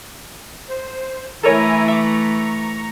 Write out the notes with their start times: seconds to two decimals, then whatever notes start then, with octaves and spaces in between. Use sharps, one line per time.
0.69 C5
1.43 E3 A3 E4 A4 A#4 C#5 G#5 A#5
1.88 E5 A#5 C#6 D6